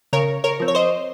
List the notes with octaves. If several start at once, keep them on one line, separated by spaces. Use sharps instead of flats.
C#3 A#4 C#5
A#4 C#5
F3 C4
C#5
C5 D#5